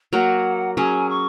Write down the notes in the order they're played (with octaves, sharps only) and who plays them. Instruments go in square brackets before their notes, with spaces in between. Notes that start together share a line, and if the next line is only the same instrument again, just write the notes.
[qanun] F#3 A#3 F#4 A#4 [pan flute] F#5
[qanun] F#3 C#4 G#4 [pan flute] G#5
[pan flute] C#6